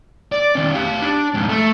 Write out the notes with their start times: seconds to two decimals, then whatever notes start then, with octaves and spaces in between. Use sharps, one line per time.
0.32 D5
0.55 D#3 C#4
0.74 G4 F5
1.02 D4
1.34 F2 G#2
1.49 A3